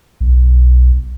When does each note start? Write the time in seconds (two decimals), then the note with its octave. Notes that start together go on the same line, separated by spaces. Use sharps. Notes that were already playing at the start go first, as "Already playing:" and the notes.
0.21 B1